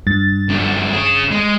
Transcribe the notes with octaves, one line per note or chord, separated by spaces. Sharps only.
G2 A6
F#2 D3
C#4 G#4
G#3